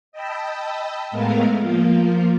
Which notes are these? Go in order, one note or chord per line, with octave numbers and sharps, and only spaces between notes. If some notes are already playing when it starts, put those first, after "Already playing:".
D#5 G5 A5 B5 E6
A2 G#3 A3 B3 A#4 F5
F3 A#3 F4